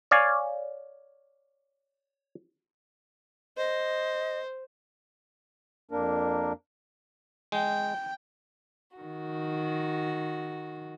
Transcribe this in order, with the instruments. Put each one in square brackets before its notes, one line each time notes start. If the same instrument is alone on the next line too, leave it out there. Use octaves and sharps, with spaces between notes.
[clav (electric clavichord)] C#5 D5 F5 G#5
[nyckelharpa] C5 [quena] D#5
[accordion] F2 A#3 D4 A#4
[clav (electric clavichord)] G#3 [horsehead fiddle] G5
[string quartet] D#3 F#4